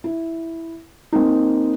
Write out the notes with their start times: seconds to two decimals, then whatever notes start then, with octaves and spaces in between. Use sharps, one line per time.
0.04 E4
1.12 A#3 C4 D#4